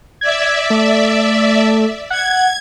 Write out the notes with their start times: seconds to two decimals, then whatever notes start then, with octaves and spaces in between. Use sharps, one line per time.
0.21 D5 E5 G#6
0.70 A3
2.10 F#5 G#6